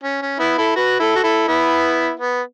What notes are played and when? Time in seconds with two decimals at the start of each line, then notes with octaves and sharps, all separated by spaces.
0.03 C#4
0.22 C#4
0.40 B3 E4
0.58 E4 A4
0.76 F#4 B4
0.99 E4 A4
1.16 F#4
1.23 E4 A4
1.48 B3 E4
2.19 B3